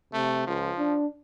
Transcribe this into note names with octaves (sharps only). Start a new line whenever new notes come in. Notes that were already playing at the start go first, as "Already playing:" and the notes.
C3 A3
C#2 F3
D4